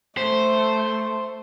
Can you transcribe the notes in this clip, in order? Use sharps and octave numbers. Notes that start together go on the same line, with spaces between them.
A3 C5